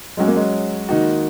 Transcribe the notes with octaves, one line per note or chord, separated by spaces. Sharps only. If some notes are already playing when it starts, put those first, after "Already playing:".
F#3 G#3 C#4 F#4
A#3
G#3
D#3 A#3 D#4 F#4